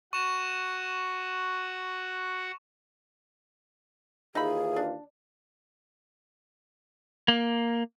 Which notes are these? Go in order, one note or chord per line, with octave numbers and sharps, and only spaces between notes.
F#4 F#5 C#6 E7
D#2 E3 D#4 F4 G#4 E5 B5
D4
A#3